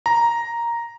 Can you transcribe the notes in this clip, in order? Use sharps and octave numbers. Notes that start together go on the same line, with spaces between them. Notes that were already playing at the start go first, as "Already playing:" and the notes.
A#5